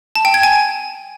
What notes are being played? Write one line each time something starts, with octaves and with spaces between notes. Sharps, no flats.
A5
G5
G#6
G#5